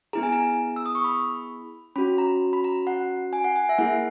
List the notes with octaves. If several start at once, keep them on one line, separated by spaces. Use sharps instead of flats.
B3 E4 G#4 A#5
G#5
A#5
E6
D#6
C#6
B5
C#4 F#4 B5
A#5
B5
A#5
F#5
G#5
F#5
G#5
E5
A#3 E4 G#4 F#5